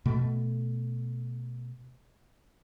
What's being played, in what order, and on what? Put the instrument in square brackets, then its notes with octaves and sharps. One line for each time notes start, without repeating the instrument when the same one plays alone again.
[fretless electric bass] B2 A3